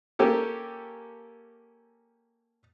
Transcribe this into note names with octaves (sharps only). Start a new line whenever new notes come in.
A#3 C#4 G4 A4